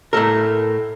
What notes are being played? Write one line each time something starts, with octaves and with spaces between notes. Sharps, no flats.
A2 A3 A4 A#4